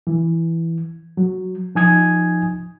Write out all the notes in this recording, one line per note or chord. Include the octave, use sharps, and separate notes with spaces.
E3
F#3
F3 D#4 G#5 D#6 G#6